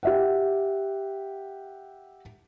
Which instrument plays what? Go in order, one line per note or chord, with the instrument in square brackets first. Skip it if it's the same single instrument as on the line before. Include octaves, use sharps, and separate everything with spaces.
[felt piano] G4 E5 F#5